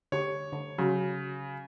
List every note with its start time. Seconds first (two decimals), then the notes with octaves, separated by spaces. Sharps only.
0.12 D3 G4 C#5
0.53 D3
0.78 C#3 F#3